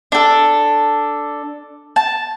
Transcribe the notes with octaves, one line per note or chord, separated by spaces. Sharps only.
D4 A4
A5